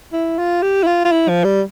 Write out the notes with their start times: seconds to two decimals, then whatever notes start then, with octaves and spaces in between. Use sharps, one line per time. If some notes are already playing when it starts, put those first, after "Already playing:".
0.13 E4
0.38 F4
0.62 G4
0.83 E4
0.87 F4
1.05 F4
1.12 E4
1.29 F3
1.44 G3